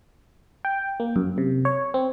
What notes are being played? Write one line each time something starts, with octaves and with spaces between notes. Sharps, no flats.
G5
A#3
F#2
C3
C#5
C4